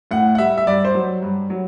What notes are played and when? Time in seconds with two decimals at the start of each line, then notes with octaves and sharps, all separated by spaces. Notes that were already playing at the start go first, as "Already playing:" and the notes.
0.11 A2 F#5
0.35 F#5
0.38 G3 E5
0.58 E5
0.67 G2 D5
0.85 C5
0.94 F#3
1.23 G2
1.50 F#3